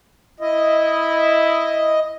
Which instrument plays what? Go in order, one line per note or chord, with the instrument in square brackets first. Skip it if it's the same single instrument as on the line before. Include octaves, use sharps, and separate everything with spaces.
[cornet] E4 [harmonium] D#5